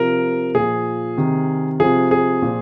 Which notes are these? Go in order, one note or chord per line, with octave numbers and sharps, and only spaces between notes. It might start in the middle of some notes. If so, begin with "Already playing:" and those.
Already playing: C3 F3 A#4
A#2 F3 G#4
C3 D#3
C3 F3 G#4
G#4
A#2 F3